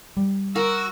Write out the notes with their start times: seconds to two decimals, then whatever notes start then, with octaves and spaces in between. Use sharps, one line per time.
0.17 G3
0.56 F#4 A#4 E6